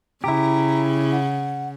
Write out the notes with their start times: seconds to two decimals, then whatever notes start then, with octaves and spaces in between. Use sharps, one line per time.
0.24 C#3 E4 G4 A#5
1.11 F#5